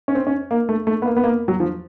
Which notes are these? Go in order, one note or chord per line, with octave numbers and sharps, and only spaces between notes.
C#4
C4
C#4
A#3
A3
A3
B3
A#3
B3
A#3
F#3
F3